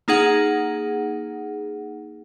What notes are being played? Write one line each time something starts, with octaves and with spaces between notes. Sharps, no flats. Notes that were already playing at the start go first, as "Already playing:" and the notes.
A#3 D#4 G#4 F#5